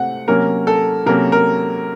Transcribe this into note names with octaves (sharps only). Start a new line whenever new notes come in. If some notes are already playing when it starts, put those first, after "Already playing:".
Already playing: C3 A3 C4 F#5
C3 F#3 A#3 C#4 A#4
A4
C3 F#3 A#3 C#4 A#4
A#4